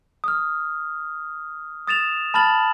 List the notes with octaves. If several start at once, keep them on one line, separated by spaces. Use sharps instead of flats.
D#6 F6
D#6 A6 E7 F7
A5 B5 F6 A6 F#7